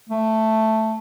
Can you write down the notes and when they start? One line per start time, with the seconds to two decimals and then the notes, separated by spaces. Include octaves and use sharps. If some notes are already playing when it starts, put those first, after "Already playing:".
0.09 A3